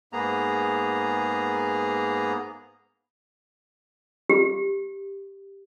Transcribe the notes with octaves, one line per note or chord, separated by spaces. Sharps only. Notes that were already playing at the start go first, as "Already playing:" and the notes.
G#2 A#3 B3 G#4 A#5
G4